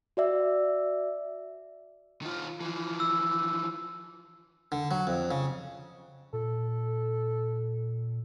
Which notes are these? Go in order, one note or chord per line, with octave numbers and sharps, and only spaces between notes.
F#4 D5 E5
D#3 F4
E3 F3
E6
D3
F#3
F2
C#3
A#2 A4